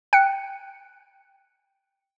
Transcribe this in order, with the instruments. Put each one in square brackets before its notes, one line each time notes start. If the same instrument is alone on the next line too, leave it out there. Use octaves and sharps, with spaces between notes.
[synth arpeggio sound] G5 F#6 C#7